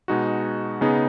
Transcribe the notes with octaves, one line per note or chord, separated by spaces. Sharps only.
B2 G#3 D#4 F#4
C#3 B3 D#4 G#4